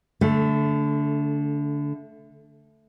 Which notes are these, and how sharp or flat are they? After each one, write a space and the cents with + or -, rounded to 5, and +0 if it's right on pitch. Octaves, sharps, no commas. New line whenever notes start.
D3 -20 A3 +0